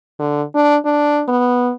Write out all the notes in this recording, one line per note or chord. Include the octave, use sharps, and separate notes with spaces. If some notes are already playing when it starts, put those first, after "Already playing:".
D3
D4
D4
B3